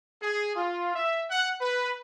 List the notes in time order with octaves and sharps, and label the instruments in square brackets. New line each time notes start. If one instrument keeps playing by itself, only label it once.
[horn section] G#4
F4
E5
F#5
B4